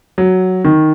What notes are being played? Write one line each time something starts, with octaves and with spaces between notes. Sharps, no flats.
F#3
D#3